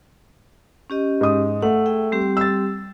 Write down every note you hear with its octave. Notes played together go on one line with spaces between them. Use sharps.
C#4 G4 D#5
G#2 D#6
A3 F#5
G#4 E5 G5
G3 C4 G4
E6 A6